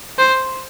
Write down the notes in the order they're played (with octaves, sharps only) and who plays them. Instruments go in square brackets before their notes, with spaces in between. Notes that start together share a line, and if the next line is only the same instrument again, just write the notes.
[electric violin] C5